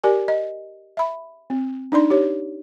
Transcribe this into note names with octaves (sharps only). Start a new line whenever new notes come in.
G4 A#4 D5 G#5
D#5
E5 B5
C4
D4 D#4 D5 C6
G4 C#5